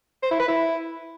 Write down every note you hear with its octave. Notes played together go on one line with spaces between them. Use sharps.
C5
E4
B4
E4